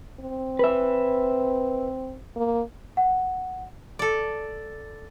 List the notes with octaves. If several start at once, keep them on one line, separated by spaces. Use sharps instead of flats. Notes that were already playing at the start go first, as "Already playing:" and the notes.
C4
B4 E5
A#3
F#5
A4 D5